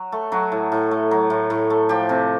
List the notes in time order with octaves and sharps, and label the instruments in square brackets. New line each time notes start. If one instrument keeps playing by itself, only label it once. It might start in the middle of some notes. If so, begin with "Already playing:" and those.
Already playing: [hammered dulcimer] F#3 F#4
A3
F#3 F#4
A2
A2
A3
F#3
A2
A2
A3
F3 G4
C3